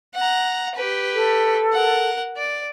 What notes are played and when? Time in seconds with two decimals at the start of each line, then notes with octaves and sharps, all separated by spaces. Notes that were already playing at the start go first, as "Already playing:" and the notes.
0.15 F#5 A#5
0.75 G4 B4
1.14 A4
1.73 A#4 F#5
2.37 D5